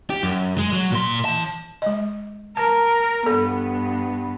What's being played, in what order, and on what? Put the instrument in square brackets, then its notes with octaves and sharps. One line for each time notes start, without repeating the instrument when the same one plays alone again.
[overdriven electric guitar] G4
F#2
G#3
F#3
A#2 C6
E3 A5
[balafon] G#3 D#5
[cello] A#4 [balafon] A5
[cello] G2 B3 [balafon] A4